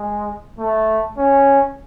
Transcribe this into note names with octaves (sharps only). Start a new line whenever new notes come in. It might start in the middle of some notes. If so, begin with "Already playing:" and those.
Already playing: G#3
A3
C#4